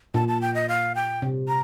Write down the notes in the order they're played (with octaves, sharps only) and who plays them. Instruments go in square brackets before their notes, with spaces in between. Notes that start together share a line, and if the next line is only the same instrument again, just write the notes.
[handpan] A#2 [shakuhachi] A5
[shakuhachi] A5
G5
D#5
F5
G5
[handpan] C3
[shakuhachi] A#5